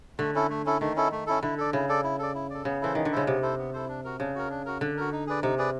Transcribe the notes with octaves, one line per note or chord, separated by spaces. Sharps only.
D3 A3
C#4 E4 A4
A3
C#4 E4 A4
D#3 A3
C#4 E4 A4
A3
C#4 E4 A4
D3 E4
A4 D5
C#3 E4
A4 D5
E4
A4 D5
E4
A4 D5
C#3 B3
E3 E4 A4 C5
D#3 B3
D3
C#3 E4 A4 C5
C3 B3
E4 A4 C5
B3
E4 A4 C5
D4
F#4 A#4
C#3 D4
F#4 A#4
D4
F#4 A#4
D3 D4
F#4 A#4
D#4
G#4 B4 D5
C3 D#4
G#4 B4 D5